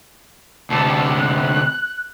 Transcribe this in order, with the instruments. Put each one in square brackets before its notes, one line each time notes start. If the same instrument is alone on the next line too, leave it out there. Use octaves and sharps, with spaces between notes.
[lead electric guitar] D2 C3 [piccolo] A5
[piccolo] F#6